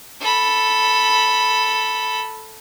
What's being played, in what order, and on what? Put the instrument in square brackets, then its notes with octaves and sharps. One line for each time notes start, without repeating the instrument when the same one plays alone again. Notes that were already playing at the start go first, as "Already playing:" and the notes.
[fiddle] A4 B5